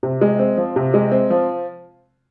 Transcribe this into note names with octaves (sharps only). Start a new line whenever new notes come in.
C3
G#3
C4
F3
C3
G#3
C4
F3